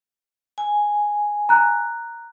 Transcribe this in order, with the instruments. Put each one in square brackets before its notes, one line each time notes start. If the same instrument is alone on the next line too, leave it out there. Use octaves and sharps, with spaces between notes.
[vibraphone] G#5
[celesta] A#5 F#6